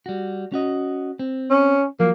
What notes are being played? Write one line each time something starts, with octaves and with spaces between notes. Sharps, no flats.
G3 F#4
C#4 F#4 D#5
C4
C#4
F3 F#3 A#3